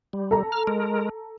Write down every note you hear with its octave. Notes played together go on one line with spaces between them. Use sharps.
G3
A4 A#5
F6
G#3 A#4